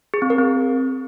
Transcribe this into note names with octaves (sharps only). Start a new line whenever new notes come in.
G#4
C4
A#4
C4